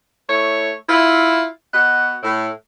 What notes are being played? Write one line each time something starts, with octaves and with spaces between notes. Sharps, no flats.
A3 E4 C#5
E4 F4
B3 F#4 D#5 F#5
A2